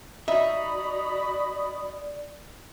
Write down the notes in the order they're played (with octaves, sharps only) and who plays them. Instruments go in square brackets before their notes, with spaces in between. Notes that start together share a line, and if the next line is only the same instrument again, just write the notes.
[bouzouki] D#4 [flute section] F#4 B5 D#6 [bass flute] D5 [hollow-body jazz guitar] E5